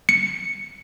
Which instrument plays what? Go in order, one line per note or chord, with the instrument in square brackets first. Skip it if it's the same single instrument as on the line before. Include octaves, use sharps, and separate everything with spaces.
[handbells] C#7